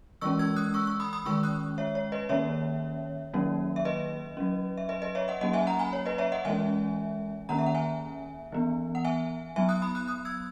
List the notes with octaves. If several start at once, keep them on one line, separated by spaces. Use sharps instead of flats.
E3 G#3 C#4 C#6 E6
E6 G#6
D#6 F#6
C#6 E6
C#6 E6
B5 D#6
B5 D#6
D#3 G#3 C#4 C#6 E6
D#6 F#6
C#5 E5
C#5
B4 D#5
D#3 A#3 C#4 C#5 E5
D#3 F#3 A#3 C#4
E5
B4 D#5
F#3 C#4
E5
B4 D#5
B4 D#5
C#5 E5
D#5 F#5
F#3 A#3 C#4 D#5 F#5
E5 G#5
F#5 A#5
G#5 B5
C#5
B4 D#5
C#5 E5
D#5 F#5
E3 G#3 C#4 E5 G#5
D#3 A#3 C#4 F#5 A#5
E5
F#5
E5 G#5
E3 B3
F#5
E5 G#5
F#3 B3 E5 G#5
D#6 F#6
B5 D#6
D#6 F#6
D#6 F#6
E6 G#6